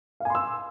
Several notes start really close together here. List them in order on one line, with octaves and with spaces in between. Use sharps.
F5 G#5 C6 E6